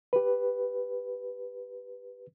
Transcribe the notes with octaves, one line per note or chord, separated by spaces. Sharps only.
G4 B4